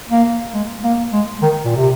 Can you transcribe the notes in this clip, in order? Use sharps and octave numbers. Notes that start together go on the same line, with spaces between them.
A#3
G#3
A#3
G#3
D#3
A#2
C3